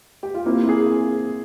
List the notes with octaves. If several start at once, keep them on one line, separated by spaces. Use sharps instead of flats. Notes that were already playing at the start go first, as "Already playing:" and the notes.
G4
F4
A#3 C4 E4
C4 E4
G#4